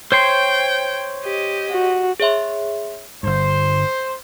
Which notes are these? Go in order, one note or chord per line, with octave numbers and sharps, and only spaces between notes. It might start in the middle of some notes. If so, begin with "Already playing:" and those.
C5 C#5 G5 C6
G4 D#5
F#4
G#4 C#5 E5 C6
G1 G2 C5